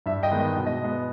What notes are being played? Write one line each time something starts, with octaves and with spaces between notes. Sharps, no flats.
G2 E5
D#5 G5
D#3 G#3 B3
D#5
B2
D#5
G#3 B3